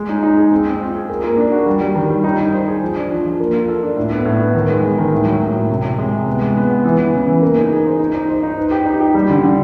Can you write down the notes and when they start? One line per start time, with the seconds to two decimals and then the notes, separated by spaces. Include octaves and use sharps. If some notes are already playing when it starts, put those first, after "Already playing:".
Already playing: G#3
0.09 D#4
0.23 D#4
0.37 G#4
0.51 C4
0.66 C4
0.80 F4
0.95 G#4
1.09 A#4
1.23 A#3
1.37 D4
1.52 F#4
1.66 G3
1.81 G3
1.95 D#3
2.10 G3
2.24 D#4
2.39 D#4
2.54 C5
2.68 G#4
2.81 F3
2.95 D4
3.11 F3
3.25 F3
3.40 A#3
3.54 F4
3.68 A4
3.83 D4
3.96 A2
4.11 B3
4.25 A2
4.40 B3
4.54 D#3
4.69 G#3
4.83 G#3
4.98 D#3
5.12 A2
5.26 F#3
5.41 A2
5.56 A2
5.70 C3
5.84 C3
5.98 G#3
6.13 C3
6.26 B3
6.41 G#3
6.56 B3
6.71 B3
6.84 E3
6.99 E3
7.14 C#3
7.28 E3
7.42 A#3
7.57 D#4
7.70 G#4
7.86 C5
7.99 D#4
8.15 D#4
8.29 C5
8.43 D#4
8.58 B4
8.71 G4
8.85 D#4
9.00 G4
9.15 G3
9.29 D3
9.44 D3